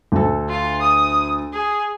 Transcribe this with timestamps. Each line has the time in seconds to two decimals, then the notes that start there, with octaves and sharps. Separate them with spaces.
0.12 D2 A4
0.49 F4
0.81 D#6
1.53 G#4